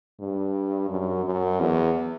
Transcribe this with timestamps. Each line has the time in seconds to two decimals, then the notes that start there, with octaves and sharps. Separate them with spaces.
0.20 G2
0.89 F#2
1.25 F#2
1.60 E2